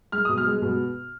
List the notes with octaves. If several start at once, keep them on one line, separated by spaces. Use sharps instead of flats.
G#3 F6
B2 D#6
F6
G#3
B2